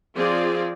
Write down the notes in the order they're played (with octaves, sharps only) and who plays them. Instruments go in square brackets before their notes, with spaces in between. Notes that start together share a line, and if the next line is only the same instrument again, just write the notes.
[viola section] F3 C4 F4 G#4 D5